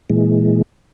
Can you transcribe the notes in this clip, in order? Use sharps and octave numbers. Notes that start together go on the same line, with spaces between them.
A#2 E3 G#3